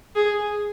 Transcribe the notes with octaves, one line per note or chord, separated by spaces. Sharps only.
G#4